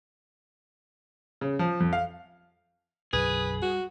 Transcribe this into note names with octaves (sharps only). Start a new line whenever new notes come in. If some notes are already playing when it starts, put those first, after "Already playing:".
C#3
F3
F2
F5
B1 F#2 D3 G#4 B4
G3 F#4